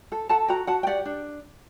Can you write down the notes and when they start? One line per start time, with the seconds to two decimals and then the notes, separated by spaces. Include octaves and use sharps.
0.12 A4
0.29 A4 F#5 A5
0.48 F#4 G5 A#5
0.67 F#4 F#5 A5
0.83 G5
0.87 G4 D5 F#5
1.05 D4